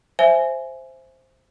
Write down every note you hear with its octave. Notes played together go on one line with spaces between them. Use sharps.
C5 E5 G#5